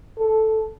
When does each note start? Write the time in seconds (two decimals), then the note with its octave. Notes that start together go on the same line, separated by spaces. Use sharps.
0.18 A4